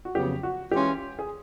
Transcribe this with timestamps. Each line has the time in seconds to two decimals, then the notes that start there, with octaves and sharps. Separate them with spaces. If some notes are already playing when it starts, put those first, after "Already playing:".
0.05 F#4
0.15 F2 C#3 F#3 B3 G4
0.43 F#4
0.71 E3 G#3 C#4 F4 G4
1.19 G#4